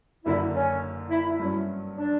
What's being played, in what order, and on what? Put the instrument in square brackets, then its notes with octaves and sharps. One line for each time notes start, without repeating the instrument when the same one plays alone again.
[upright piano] F#1 F#2 D3 [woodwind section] E4
[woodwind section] C#4
E4
E4
[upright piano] G2 F#3 C#4
[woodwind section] D4